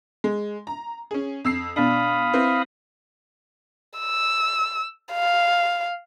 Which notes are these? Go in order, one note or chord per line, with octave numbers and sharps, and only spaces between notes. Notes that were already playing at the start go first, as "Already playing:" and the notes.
G#3
A#5
C#4 G#4
F2 E6 C7
B2 D4 F5 B5 D#6
C4 E4 B4
E6
F5